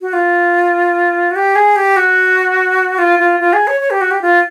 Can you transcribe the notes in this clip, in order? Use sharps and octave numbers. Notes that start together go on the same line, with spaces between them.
F#4
F4
F#4
G4
G#4
G4
F#4
F4
F4
F4
G#4
C#5
C#5
G4
F#4
G4
F4